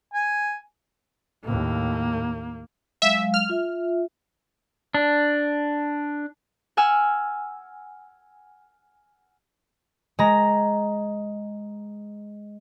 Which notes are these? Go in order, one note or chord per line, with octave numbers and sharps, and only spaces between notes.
G#5
D#2 A2 A#3
F#3 G#3 E5 F5
F6
F4 E5
D4
F#5 G#5 E6 F6
G#3 A#5